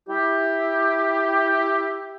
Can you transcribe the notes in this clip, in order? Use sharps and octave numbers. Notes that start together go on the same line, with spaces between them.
E4 G4